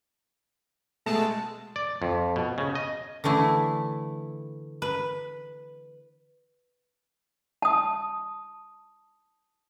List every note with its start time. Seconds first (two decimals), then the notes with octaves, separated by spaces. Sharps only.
1.06 B2 G#3 A3 A5
1.76 D5
2.02 F2
2.36 B2
2.58 C#3
2.75 D#5
3.24 D3 E3 A3 E4
4.82 B4
7.62 A5 D#6